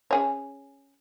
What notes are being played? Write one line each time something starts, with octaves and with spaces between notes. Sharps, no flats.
C#4 G#4 C#5